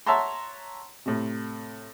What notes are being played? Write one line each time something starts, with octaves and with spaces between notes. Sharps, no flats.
C#5 E5 F#5 A5 A#5 C6
A2 C3